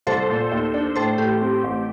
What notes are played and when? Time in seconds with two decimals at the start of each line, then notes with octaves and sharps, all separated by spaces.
0.07 C2 A4 C5
0.29 A#2
0.52 D#2
0.74 D4
0.96 A2 A4 C5
1.18 A2 G4
1.41 C4
1.64 A1